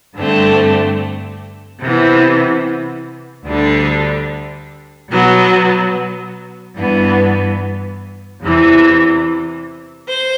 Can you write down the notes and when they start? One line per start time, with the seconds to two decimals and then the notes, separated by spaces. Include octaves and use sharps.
0.16 G2 D3 A3 C4
1.81 C3 E3 B3
3.46 D2 D3 G3 D4
5.11 B2 F#3 B3
6.76 G2 E3 B3
8.41 E2 C3 E3
10.07 C5